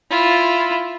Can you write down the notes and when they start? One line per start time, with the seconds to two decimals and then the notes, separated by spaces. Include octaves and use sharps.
0.10 E4 F4